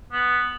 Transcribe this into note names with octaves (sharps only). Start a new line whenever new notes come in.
B3